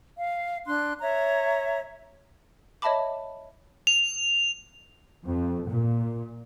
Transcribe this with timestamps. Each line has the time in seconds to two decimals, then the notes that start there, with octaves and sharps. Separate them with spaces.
0.18 F5
0.66 D4 C6 F#6
1.01 C#5 E5 A#5
2.82 C#5 D#5 E5 A5 B5 D6
3.87 F7
5.26 F2
5.68 A#2